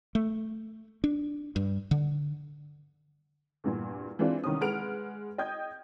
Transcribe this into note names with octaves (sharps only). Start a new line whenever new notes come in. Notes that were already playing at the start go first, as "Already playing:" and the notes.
A3
D4
G2
D3
E2 G2 A#2
E3 G#3 C4 D4 F4
C2 D#3 C#4 D#6
G#3 B4 F#5 F6 D7 F7
D#5 G5 D#6 G6 G#6